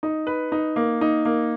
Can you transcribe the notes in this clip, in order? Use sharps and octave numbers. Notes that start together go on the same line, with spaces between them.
D#4
B4
D#4
A#3
D#4
A#3